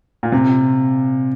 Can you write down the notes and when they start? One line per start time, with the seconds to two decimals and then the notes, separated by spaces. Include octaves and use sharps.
0.23 A#2
0.32 C3